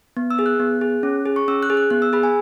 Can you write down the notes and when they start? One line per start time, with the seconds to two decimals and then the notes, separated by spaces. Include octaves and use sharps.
0.17 B3
0.31 E6
0.39 G#4
0.46 F#6
0.60 B3
0.81 G#4
1.03 C#4
1.26 G#4
1.36 C#6
1.48 C#4 E6
1.63 F#6
1.70 G#4
1.77 F#6
1.90 B3 F#6
2.02 E6
2.13 G#4 B5
2.23 G#5